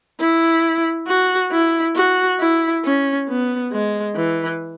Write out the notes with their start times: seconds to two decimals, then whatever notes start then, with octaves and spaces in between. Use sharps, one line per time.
0.20 E4
1.07 F#4
1.52 E4
1.96 F#4
2.40 E4
2.84 C#4
3.29 B3
3.72 G#3
4.16 E3